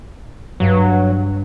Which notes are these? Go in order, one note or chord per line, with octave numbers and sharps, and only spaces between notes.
G2 F#3